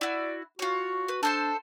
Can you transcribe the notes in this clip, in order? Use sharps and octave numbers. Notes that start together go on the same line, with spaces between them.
E4 F#4 D5
F4 F#4 C#5
B4
D4 A4 C5 C6